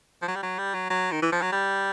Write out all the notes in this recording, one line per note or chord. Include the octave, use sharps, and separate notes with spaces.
F3
F#3
G3
F#3
G3
F#3
F#3
D#3
E3
F3
F#3
G3